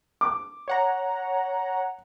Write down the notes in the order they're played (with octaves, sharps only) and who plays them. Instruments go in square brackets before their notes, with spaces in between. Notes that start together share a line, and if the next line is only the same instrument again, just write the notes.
[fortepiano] D6
[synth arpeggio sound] C#5 F#5 A#5